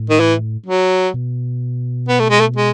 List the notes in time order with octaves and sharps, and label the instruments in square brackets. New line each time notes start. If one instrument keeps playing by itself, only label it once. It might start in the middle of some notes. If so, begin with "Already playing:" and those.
Already playing: [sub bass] A2
[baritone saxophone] D#3
E3
F#3
[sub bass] B2
[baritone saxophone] B3
A3
G#3
A3
G#3